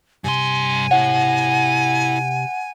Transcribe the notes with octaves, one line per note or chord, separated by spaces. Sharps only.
G2 C3 G#5 C6
E4 C#5 F#5